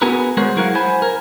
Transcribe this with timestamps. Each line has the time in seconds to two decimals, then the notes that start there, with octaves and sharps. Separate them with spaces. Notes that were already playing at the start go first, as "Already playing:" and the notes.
0.02 B3 F#4 G#4 A#4 B4
0.37 G#3 G#4 A#4 C5 C#5 F#5
0.57 F#3 E4 G#4 A#4 F5 F#5
0.75 C5 F#5 G#5 B5
1.02 A#4